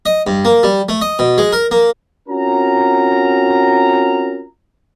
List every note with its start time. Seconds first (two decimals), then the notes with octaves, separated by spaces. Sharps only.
0.06 D#5
0.27 G2
0.45 A#3
0.63 G3
0.89 A3
1.01 D#5
1.19 B2
1.38 G#3
1.52 A#4
1.71 A#3
2.29 C4 C#4 F4 F#4 A#4 A#5